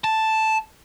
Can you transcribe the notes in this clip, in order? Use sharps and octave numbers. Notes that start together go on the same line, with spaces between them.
A5